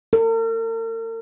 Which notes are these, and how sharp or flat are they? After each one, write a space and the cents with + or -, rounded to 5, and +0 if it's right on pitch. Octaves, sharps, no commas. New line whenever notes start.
A#4 -45